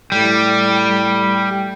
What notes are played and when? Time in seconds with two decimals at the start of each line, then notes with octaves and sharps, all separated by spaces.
0.12 A2 G3